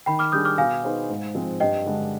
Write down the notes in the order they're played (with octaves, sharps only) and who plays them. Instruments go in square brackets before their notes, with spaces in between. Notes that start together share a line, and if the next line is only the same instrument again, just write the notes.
[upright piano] D#3 [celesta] G5 B5
[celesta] D6 F6
[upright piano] G3 D4 G#4 [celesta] D#6 G6
[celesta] D6 F6
[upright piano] B2 [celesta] F5 G#5
[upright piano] B3 D#4 G#4 C5
G#2
F3 G#3 C4
[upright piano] G2 [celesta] D#5 G5
[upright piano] D3 G#3 D4